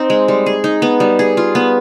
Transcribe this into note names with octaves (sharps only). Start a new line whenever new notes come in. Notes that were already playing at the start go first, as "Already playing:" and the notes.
Already playing: C4 D#4
G#3
G3
G#4
D#4
B3
G3
G#4
F4
B3